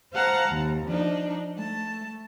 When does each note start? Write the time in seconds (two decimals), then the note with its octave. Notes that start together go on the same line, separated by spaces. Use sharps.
0.12 C5 F5 F#5 A5 A#5
0.50 D#2
0.86 F3 D4 D#4
1.56 A3 A5